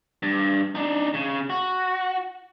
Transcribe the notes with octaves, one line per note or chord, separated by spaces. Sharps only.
G2
D4 D#4
C#3
F#4